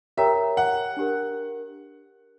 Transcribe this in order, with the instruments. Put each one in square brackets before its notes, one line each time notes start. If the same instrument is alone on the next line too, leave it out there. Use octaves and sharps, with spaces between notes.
[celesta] G4 A#4 C#5 G5 A#5 [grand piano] E5
[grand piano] F#5
[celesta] D4 G4 A#4